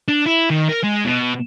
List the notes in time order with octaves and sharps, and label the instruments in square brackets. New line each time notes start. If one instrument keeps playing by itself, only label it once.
[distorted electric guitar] D4
E4
D#3
A#4
G#3
B2